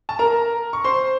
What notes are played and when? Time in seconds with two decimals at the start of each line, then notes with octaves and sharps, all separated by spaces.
0.09 A5
0.19 A#4 A#5
0.73 C#6
0.84 C5 C6